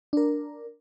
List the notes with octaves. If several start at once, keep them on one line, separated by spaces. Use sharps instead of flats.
D4 A#4